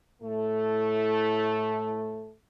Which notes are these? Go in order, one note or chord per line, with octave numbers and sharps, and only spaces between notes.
A2 A3